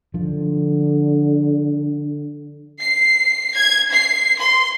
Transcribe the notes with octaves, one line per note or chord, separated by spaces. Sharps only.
D3 F3
C7
G#6
C7
C6